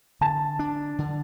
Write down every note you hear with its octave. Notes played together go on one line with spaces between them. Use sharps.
D3 A5
D4
D3